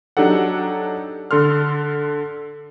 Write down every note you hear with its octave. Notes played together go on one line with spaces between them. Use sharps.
F#3 D4 D#4 G4 A4 F#5
D3 A4 C6 F6